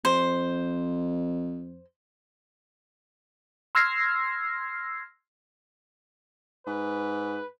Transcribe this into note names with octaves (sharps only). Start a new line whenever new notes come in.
F2 C5
C6 E6 F6 G#6 A#6 C7
G#2 B4